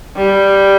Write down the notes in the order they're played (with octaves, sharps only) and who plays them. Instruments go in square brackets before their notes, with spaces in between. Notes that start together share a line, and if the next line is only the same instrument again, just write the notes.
[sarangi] G3